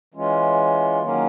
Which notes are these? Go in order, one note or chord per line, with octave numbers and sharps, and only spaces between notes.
E3 G#3 C#4 F4
D#3 F#3 A#3 C#4